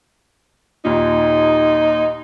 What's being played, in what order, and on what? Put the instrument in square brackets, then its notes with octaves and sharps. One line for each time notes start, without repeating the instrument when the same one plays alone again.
[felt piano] D#2 A#2 [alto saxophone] D#4